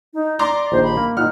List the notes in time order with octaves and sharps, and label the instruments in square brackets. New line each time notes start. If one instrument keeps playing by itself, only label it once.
[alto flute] D#4
[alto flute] D5 [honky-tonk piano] A#5 C6 D6
[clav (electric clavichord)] A#1 D#2 [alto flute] C5
[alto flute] B5
[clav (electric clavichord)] A#3
[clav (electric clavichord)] A#2 F#5 [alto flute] D#4 [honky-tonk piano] F6